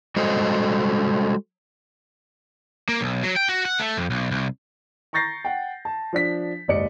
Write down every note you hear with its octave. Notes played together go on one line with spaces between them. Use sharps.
G3 G#3 F#4 A4 C5 D#5
A#3
B1
F#3
G5
F#4
F#5
A3
F2
B1
C2
A#5 C#6 G6 A6 A#6 C7
F#5 G5
A5
F3 D4 B6
F#1 D#2 G#2 D5 D#5 C#7